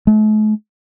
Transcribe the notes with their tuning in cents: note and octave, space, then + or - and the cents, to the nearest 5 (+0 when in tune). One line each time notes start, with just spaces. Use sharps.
A3 -45